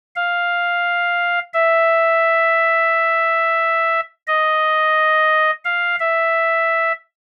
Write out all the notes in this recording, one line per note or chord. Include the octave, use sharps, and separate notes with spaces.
F5
E5
D#5
F5
E5